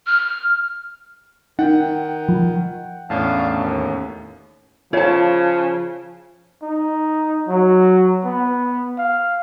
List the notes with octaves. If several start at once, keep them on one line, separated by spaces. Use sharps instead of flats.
F6
D#3 D#4 F#5 G5
F3
E2 A2 C#4 D4 F5 A5
D#2
C#3 F3 F4 C#5 E5 A5
D#4
F#3
B3
F5